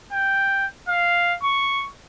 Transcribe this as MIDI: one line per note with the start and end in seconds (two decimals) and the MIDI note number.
0.12 0.66 79
0.89 1.35 77
1.43 1.87 85